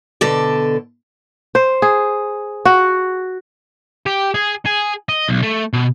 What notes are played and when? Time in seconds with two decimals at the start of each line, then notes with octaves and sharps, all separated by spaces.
0.21 B2 D3 A4 D5
1.55 C5
1.82 G#4
2.65 F#4
4.06 G4
4.34 G#4
4.66 G#4
5.09 D#5
5.29 B1
5.43 A3
5.73 B2